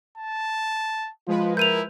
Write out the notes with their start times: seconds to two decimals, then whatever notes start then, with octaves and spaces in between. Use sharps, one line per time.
0.18 A5
1.27 F3 G#3 F4 B4
1.57 E4 A#4 G6 D#7 F7